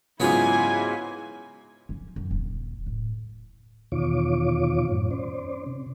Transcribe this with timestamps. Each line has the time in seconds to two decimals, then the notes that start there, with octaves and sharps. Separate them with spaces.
0.20 G#2 C#3 F#3 B3 E4 F4 G#4 G#5
1.89 F3
2.16 F#2
2.31 D#1
2.86 A2
3.92 E2 B2 D#3 F4 C#5 D6
4.89 F#2 A2
5.11 C#4 C5 D5
5.66 C3